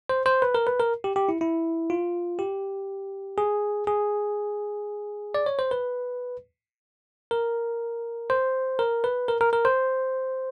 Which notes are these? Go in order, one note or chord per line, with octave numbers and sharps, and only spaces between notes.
C5
C5
B4
A#4
B4
A#4
G4
G4
E4
E4
F4
G4
G#4
G#4
D5
C#5
C5
B4
A#4
C5
A#4
B4
A#4
A#4
A#4
C5